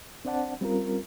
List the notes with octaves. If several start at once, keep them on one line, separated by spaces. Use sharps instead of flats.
C4 D4 C5 D5 F#5 A5
G3 C4 C#4 F4 A#4